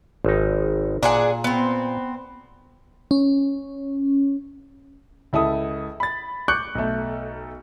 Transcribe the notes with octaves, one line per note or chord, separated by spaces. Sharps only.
G#1 D#4
A#2 D4 G#4 F#5
B3 C4
C#4
C#2 E4 A4 D#6
B5 A6
C#6 D6 F#6 G6 C#7
B1 A3